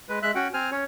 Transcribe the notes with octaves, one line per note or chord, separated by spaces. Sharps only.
G#3 B4
G#3 E5 F#6
C#4 F#4 F#5 G5
C4 C5 G#5 F6
C#4 C#5